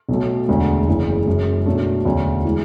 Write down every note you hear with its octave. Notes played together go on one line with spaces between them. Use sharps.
B1 B2 F#3 A3
E1 D2 D3 G#3
F#1 E2 C#3 E3 G#3
F#1 F#2 E3 G#3
B1 B2 F#3 A3 D4
E1 D2 D3 F#3 C#4
E3 G#3